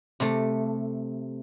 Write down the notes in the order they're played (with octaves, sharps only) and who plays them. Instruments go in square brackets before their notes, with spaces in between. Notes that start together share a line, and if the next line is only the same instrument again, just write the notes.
[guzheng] C3 A3